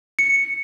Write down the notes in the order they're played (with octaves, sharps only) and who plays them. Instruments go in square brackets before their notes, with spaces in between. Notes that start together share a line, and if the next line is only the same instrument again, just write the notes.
[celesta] C#7